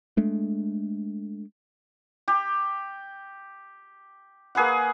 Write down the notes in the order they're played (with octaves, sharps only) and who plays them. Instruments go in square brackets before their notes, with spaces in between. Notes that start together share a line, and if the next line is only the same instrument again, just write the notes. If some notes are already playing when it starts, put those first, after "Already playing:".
[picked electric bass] G#3 A3 D4
[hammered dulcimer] G4
A#3 G#4 B4 F#5